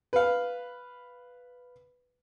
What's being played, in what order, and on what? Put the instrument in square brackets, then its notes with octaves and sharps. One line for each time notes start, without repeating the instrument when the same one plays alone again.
[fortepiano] B4 F5